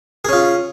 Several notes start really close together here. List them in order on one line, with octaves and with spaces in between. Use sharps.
G#4 C#4 F4